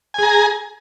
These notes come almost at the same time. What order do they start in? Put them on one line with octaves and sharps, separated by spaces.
G#5 G#4 A#5